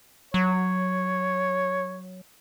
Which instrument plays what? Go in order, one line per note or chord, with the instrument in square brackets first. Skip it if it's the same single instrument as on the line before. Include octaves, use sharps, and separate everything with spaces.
[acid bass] F#3 [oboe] C#5